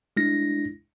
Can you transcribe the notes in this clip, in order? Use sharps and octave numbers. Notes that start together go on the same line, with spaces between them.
G#3 D4 E4 A#6